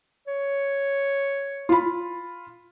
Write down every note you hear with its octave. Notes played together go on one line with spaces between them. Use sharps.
C#5
F4 B5